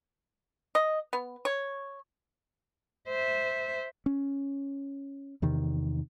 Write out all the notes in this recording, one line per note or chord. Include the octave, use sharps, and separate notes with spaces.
D#5
B3
C#5
C5 E5
C#4
E2 C3 D#3